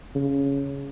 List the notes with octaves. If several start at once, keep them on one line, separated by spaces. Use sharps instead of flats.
C#3